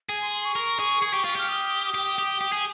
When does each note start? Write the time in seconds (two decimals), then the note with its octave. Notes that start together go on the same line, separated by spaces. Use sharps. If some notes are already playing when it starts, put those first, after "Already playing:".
0.09 G#4 G#5
0.21 C6
0.33 C6
0.45 C#6
0.56 A#4
0.79 G#4
1.02 G#4
1.13 G4
1.24 F4
1.35 G4 F6
1.48 D#6
1.94 G4
2.18 G4
2.41 G4
2.52 G#4